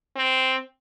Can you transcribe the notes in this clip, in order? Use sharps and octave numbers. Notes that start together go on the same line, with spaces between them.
C4